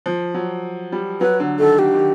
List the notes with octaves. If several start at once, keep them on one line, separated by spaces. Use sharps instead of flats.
F3
F#3
G3
F#3 B4
D3
D#3 A4
D3 G4
D#3